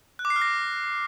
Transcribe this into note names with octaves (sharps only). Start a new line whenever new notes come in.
F#6
D6
C7
F6
A#6